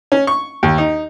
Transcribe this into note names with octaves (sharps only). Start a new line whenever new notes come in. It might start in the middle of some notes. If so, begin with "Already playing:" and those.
C#4
C#6
D#2
D#4